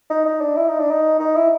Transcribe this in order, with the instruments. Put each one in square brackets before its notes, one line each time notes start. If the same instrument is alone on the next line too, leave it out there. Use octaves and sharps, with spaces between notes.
[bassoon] D#4
D#4
D4
E4
D#4
D4
D#4
D#4
E4